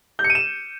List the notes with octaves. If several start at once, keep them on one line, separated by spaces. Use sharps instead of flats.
G6
C#7
D#7
E7